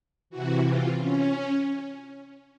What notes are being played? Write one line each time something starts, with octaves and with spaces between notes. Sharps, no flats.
C3 E3 F#4
F4
C#4